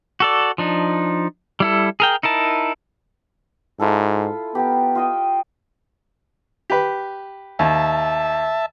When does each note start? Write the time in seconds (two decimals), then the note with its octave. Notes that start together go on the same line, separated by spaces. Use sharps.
0.20 F#4 A4 D5
0.58 F3 D4 D#4
1.60 G3 E4 A4
2.00 G#4 A#4 G5
2.23 D#4 E4 A#4 A5
3.80 G#2 E4 F4 A4
4.55 B3 G4 A#4
4.95 F4 D#5 G5
6.70 G4 B4
7.59 D#2 E5 A5